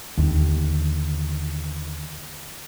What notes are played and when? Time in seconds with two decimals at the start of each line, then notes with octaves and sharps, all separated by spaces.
0.18 D#2 D3